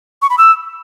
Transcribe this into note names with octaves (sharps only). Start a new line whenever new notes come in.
C#6
B5
E6